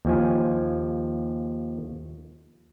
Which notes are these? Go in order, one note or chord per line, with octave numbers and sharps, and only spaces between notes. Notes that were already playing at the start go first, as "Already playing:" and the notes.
D#2 F3 G#5